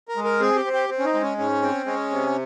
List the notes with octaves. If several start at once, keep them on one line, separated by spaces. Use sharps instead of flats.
A#4
G#3
A#4
C4 G#4
G4
C4
G4
C4
C#4
D#4
G#3
C#4
G#2 C#4
C4
G#3 C#4
C3